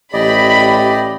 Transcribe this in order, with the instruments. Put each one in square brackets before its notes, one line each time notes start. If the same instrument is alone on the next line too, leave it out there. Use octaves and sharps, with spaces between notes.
[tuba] A1 [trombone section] G4 [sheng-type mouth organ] D5 D#5 [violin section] B5